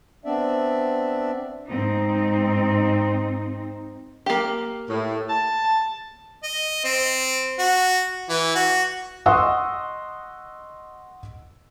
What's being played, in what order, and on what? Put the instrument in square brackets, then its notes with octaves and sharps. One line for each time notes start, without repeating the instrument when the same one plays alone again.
[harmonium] B3 C4 D4 D5 E5
[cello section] G#2 C4 D#4
[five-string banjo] A#3 G4
[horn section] A2
A5
[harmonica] D#5
C4
F#4
E3
F#4
[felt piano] D#5 F#5 C6 C#6 D#6 E6